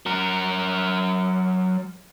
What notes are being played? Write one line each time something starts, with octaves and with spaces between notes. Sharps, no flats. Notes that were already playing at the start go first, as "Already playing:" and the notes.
F#3 A#4